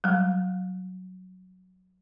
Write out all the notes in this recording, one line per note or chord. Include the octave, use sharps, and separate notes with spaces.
F#3 G3